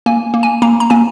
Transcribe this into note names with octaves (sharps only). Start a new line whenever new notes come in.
A#3 G#5
A#3
G#5
A#3 A#5
A#5
A#3 G#5